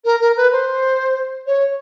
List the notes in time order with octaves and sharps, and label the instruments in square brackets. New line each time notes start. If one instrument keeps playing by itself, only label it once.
[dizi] A#4
A#4
B4
C5
C#5